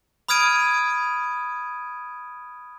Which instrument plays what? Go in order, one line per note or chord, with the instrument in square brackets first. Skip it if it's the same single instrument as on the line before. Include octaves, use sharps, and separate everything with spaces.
[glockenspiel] B5 D#6 F6 G#6 D7 D#7